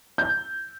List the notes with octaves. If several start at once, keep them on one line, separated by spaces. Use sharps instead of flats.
G6